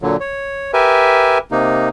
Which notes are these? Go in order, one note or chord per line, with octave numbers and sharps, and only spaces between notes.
A#2 D3 F#3
C#5
G4 A#4 B4 E5 G#5
C3 A#3 D#4